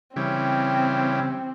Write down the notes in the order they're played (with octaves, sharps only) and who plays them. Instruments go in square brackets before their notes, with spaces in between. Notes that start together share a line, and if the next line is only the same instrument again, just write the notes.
[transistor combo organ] C#3 E3 G3 [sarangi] C4